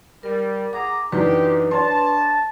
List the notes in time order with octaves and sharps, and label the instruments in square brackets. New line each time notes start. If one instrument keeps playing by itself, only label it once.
[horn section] G3 [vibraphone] A#4
[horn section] G#4 A#5 [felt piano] F#5 [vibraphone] D6
[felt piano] F#2 E3 D4 [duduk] D#4 [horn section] G4 [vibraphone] B4
[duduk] D4 [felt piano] C#5 C6 [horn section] A5